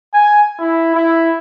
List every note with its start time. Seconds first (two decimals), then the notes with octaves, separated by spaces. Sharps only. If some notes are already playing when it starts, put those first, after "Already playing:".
0.14 G#5
0.59 E4
0.95 E4